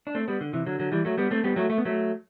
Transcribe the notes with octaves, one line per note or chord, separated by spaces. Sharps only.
D4
A3 C4
G3 B3
D3
C3 E3
D3 F#3
D3 F#3
E3 G3
F#3 A3
G3 B3
A3 C4
G3 B3
F#3 A3
A3
B3
F#3 A3